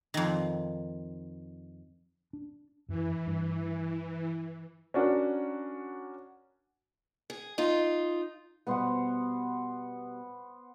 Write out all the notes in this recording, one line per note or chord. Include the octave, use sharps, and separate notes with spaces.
F2 D#3
D4
F#2 E3
G2
C#4 D4 F#4 A#4
G#4
D#4 F4
B2 G3 B3 C5 F#5